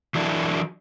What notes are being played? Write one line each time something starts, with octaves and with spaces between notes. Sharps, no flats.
E3 F#3 D4 E4